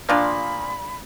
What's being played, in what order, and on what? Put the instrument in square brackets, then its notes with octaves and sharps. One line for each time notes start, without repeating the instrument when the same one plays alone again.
[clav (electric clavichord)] A#2 F3 A#3 [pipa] D4 F4 D5 [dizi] B5